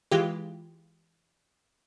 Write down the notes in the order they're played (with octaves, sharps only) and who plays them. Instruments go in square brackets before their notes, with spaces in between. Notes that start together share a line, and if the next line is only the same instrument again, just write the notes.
[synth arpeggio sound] E3 G#3 F4 G4